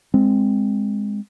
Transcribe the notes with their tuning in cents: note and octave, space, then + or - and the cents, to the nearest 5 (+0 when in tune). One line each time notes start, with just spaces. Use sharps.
G#3 -10 C4 +0